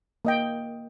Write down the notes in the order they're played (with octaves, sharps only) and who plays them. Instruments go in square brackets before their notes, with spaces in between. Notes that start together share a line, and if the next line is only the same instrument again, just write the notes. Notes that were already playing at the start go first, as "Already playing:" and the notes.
[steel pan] A#3 D#5 G5